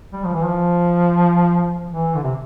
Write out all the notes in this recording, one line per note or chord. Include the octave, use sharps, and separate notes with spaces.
G3
F3
E3
F3
E3
D3
C3